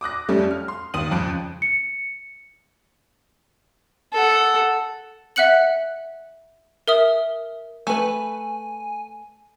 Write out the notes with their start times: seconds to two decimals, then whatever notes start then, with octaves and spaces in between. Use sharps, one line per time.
0.01 D6 D#6 F#6 A#6
0.29 F2 G3 A3 C#4
0.51 F6
0.68 C6
0.94 D#2 D#6 D#7 F#7
1.11 F2 C#3 F3 F#6 D7
1.62 C#7
4.13 A4 F#5
5.36 E5 F#5 F#6 C#7 F#7
6.88 A#4 E5 D#6
7.87 A3 B4 G#5